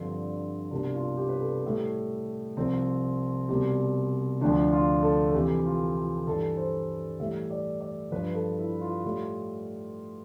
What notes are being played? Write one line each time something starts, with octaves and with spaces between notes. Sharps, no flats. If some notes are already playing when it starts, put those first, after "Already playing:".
Already playing: G2 D3 F3 C4
C2 B2 G3 D4
F4
G4
B4
A4
A2 G3
C2 C3 F3 C4
C2 B2 G3
D2 D3 F3 D4
F4
A4
A4
F2 C3 E3 G4
F4
F4
G2 E3 G3 A4
C5
A2 E3 G3 E5
D5
D5
G2 F3 B4
A4
E4
F4
A2 G3